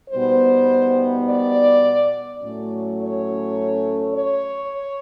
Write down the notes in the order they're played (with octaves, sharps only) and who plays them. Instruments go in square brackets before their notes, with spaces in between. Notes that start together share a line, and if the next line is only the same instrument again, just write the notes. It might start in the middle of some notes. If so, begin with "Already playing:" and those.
[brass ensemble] B2 G3 B3 D#4 C5
D5
A2 F#3 A3 C#4
C#5
C#5